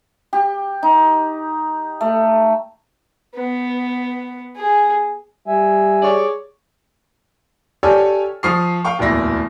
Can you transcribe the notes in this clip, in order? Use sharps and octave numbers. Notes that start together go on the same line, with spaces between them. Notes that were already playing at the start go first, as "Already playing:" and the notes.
G4
D#4
A3
B3
G#4
G3 E5 G#5
G#4 C#5 D5
G4 A4 C#5 D5 G#5 F6
F3 C#6 D#6 F6 C7
F5 G5 C#6
D1 E2 A#2 E4 A#6